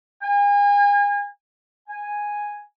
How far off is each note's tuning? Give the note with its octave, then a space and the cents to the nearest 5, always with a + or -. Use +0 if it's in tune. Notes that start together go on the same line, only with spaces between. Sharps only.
G#5 -35
G#5 -5